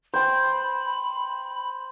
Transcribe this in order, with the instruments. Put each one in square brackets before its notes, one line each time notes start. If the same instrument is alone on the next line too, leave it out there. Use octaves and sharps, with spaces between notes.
[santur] C5 G5 [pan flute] B5